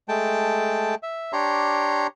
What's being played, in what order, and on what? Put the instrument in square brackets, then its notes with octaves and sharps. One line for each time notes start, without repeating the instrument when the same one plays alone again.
[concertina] G#3 A3 G5 A5
E5
D4 G4 C#5 A#5 C6